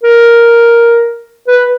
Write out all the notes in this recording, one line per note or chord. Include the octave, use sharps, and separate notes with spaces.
A#4
B4